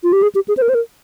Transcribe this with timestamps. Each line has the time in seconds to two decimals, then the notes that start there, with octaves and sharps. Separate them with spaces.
0.03 F4
0.13 G4
0.23 G#4
0.35 G4
0.48 G#4
0.57 C5
0.62 A#4
0.69 C5
0.75 A#4